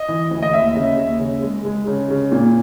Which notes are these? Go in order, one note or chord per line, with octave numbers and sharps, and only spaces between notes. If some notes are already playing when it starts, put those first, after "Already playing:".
Already playing: D#5
E3
D2
D#5
D#2 E5
C#3
D#2
C#3
G#3
G#3
C#3
C#3
A#2